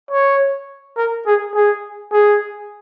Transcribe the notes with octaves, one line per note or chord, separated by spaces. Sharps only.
C#5
A#4
G#4
G#4
G#4